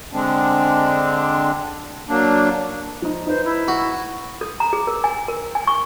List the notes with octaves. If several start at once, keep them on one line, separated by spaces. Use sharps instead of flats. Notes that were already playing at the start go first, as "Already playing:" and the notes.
D3 G#3 C4 D4
F#3 A#3 D4
F3 D#4
D#4 B4 C5
E4
F#4
A4
A#5
G#4
A#4
G#5
A#4
G#5
C#6